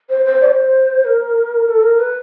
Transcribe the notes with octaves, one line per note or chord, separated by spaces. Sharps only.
C5
C5
D5
C5
A#4
A4
A#4
B4